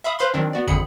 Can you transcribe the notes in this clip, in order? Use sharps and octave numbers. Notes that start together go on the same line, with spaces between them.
E5 F5 B5 D#6
B4 C5 F5 B5 C6
D#3 F#3 C4 D4
B3 F#4 D5
G#1 F2 D3 G#4 B5 C#7